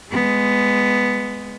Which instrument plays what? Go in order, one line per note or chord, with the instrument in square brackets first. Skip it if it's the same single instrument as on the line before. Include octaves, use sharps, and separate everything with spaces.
[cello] G#3 B3